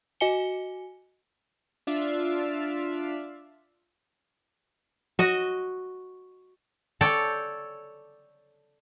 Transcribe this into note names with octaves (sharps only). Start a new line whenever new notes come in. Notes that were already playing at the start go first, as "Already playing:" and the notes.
F#4 D#5 G#5 C#7 G7
D4 F4 D5 E5 F5
F#4 D#5
A4 C#5 D5 G5